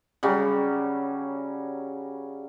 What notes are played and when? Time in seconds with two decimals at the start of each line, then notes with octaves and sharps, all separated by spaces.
0.23 C#3 F#3 G3